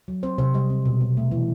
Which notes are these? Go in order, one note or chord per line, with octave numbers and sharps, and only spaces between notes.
F#3
C4 C5
C3 C5
G3 D#5
C4
B2
B3
A3
E3